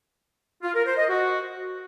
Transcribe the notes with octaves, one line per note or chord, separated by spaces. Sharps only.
F4
A#4
C5
D#5
F#4